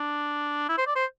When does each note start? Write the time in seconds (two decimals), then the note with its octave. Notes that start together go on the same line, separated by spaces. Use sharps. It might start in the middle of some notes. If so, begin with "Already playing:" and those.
Already playing: D4
0.69 E4
0.78 C5
0.87 D5
0.96 C5